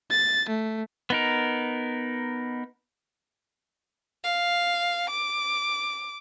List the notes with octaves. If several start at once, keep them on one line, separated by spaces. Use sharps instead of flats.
A6
A3
B3 D#4 A#4
F5
D6